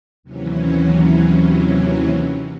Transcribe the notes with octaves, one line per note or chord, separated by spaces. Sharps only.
D#2 C3 E3 F#3 C#4